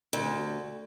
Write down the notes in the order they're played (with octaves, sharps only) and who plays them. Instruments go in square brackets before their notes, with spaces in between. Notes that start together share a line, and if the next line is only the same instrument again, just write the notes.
[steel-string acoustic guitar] D2